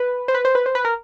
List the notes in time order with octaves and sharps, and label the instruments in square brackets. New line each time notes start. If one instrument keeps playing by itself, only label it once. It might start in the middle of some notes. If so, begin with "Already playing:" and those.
Already playing: [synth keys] B4
C5
B4
C5
B4
C5
B4
A#4